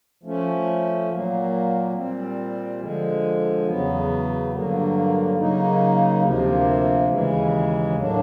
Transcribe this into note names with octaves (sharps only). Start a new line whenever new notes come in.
F3 A3 C#4
A#2 F#3 A#3
A#2 G3 C4
D3 F3 G#3
E2 C#3 F#3 B3
G2 D3 F#3 A#3
C#3 F#3 A#3 D#4
D2 C3 F3 A#3
D#2 C#3 E3 G#3
A2 F#3 A#3 D4